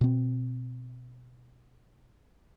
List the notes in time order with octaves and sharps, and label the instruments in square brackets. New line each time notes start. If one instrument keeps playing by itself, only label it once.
[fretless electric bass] B2 C4